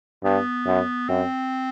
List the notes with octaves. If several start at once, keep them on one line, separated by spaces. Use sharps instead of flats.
G2 B3
F#2
F#2 C4